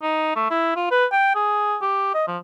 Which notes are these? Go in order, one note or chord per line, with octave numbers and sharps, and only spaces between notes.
D#4
A3
E4
F4
B4
G5
G#4
G4
D#5
F3